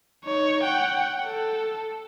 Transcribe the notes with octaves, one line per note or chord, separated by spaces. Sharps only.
D#4 C#5
F#5 G5
A4